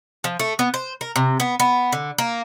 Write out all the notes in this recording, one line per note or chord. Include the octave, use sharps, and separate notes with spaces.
F3
A3
B3
C5
A#4
C3
B3
B3
D3
A#3